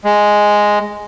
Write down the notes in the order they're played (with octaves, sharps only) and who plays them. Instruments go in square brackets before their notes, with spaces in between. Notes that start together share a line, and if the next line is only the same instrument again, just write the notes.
[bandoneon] G#3